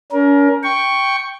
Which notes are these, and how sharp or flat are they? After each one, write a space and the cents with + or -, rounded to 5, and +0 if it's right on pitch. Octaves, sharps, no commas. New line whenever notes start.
C#4 +40 A#4 +20
G5 +0 C#6 +0